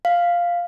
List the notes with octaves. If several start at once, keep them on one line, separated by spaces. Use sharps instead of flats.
F5